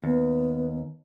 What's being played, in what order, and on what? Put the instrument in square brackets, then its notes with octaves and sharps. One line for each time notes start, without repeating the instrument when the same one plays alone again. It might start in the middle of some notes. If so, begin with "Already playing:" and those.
[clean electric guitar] D#2 [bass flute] B3